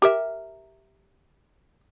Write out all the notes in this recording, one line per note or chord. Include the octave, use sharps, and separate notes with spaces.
G4 A#4 E5